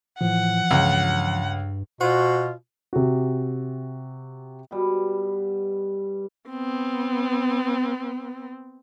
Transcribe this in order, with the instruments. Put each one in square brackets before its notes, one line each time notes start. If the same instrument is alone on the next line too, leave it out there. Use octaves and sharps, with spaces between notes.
[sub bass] A2 [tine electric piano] E3 F3 [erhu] F#5
[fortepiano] C#2 [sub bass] G2
[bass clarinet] B2 [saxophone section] F4 F#4 C5
[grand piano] C3 F#4
[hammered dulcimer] B2 G3
[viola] B3 C4